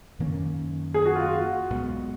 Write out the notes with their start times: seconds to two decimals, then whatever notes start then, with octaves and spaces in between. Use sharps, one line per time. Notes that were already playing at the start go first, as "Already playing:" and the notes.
0.19 F#2 D#3 A#3 C#4
0.94 G#4
1.05 F#4
1.15 F4
1.25 F#4
1.70 B1 A#2 G#3 B3